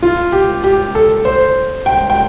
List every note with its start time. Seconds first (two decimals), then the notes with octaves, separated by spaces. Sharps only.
0.02 F4
0.32 G4
0.64 G4
0.95 A4
1.25 C5
1.86 G5
2.10 G5